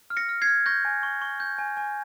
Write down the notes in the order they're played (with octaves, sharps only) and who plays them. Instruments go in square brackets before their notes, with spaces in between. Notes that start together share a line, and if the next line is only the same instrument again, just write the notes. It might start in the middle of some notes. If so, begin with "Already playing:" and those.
[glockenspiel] F6
A#6 C#7
F6
G#6 C7
F6
C#6 G6 A#6
G#5
C#6
C#6
G6
G#5
G#5